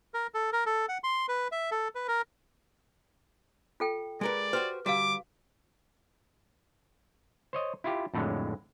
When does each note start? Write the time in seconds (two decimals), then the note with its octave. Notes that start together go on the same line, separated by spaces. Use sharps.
0.14 A#4
0.34 A4
0.52 A#4
0.66 A4
0.89 F#5
1.04 C6
1.28 B4
1.52 E5
1.71 A4
1.95 B4
2.08 A#4
3.80 F4 A4 G5
4.21 G#3 A#4 B4 D5
4.53 F#4 G4 B4 C5
4.86 D3 G3 F#4 F5 D6
7.53 C5 C#5 D#5
7.84 E4 F4 G4
8.14 F2 A2 D3 F#3 G#3